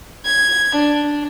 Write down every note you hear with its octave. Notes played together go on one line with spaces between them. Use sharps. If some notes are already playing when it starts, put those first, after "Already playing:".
G#6
D4